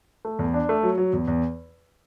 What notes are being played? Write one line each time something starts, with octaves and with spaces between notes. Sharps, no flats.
A3
E2
D4
A3
F#3
F#3
E2
E2